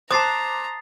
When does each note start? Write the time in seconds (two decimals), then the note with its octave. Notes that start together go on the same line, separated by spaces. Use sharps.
0.11 C5 A5 A#5 D6 D#6 F#6 A6 C7